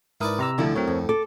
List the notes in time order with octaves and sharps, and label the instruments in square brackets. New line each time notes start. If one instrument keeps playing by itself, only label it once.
[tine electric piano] G#2 A#4 D#6 [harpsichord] E4 B4 D5
[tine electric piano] C3 A#5 E6
[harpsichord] D2 A2 [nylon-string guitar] D3 F3 E4
[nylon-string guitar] F#3 [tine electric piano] C4 A#4 C#5
[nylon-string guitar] F2
[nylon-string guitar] A4 [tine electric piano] D6